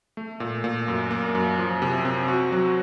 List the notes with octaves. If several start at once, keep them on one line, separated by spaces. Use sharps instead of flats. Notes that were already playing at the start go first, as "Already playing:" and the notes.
A3
A#2
A#2
F#2
A#3
F#2
F3
C3
C4
F#4
F#3